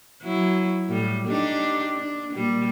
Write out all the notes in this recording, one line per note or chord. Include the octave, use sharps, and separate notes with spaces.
F#3 E4
A2 G3
D4 D#4 G4
D4
A#2 G3